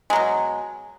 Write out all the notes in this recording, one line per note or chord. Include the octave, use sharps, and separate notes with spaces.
B2 F#3 G#3